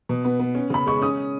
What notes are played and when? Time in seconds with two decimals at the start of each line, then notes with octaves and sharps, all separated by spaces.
0.09 B2
0.25 B3
0.39 B3
0.55 C#4
0.70 C#3 B5
0.86 G#3 C#6
1.01 C#4 D#6